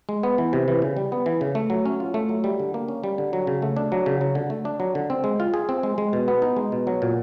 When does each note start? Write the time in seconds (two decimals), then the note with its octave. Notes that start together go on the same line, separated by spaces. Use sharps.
0.09 G#3
0.23 B3
0.38 E3
0.53 C3
0.68 E3
0.82 C#3
0.97 G3
1.12 B3
1.26 E3
1.41 C#3
1.55 A3
1.70 F#3
1.86 C#4
2.00 F4
2.14 A3
2.29 F#3
2.44 G3
2.59 D3
2.74 A#3
2.88 C#4
3.04 G3
3.18 D3
3.33 F#3
3.47 C#3
3.62 A3
3.77 D4
3.92 F#3
4.06 C#3
4.21 F#3
4.35 D3
4.50 A3
4.65 D4
4.80 F#3
4.95 D3
5.10 C4
5.24 G#3
5.40 F4
5.54 G#4
5.69 C4
5.83 G#3
5.98 G#3
6.13 B2
6.28 B3
6.42 D#4
6.57 G#3
6.72 B2
6.87 F#3
7.02 A#2